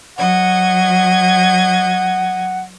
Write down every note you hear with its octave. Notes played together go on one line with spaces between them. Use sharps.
F#3 D#5 F#5 G#6